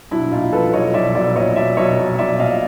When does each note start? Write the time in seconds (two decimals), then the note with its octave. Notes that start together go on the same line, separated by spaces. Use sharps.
0.11 B1 D4 E4
0.32 A#2 D#4 F4
0.52 F3 A4 B4
0.73 B1 C#5 D#5
0.94 B1 D5 E5
1.15 B1 D5 E5
1.36 A#2 C#5 D#5
1.56 B1 D5 E5
1.77 B1 C#5 D#5
1.98 B1
2.18 B1 D5 E5
2.39 A#2 D#5 F5